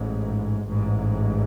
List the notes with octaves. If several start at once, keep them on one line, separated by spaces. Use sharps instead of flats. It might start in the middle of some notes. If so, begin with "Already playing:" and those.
Already playing: A1 G#2
A1 G#2